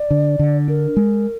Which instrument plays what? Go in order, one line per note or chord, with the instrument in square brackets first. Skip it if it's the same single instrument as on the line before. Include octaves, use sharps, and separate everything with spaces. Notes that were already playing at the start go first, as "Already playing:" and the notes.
Already playing: [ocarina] D5
[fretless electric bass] D3
D3
[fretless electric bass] D4 [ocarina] A#4
[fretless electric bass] G#3